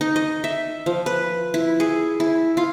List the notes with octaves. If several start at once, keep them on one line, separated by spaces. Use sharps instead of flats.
D#4
D#5
E5
F3
B4
E4
G#4
E4
F4